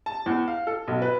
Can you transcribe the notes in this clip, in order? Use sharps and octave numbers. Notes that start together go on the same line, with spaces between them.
A5
E2
F5
A4
B1
B4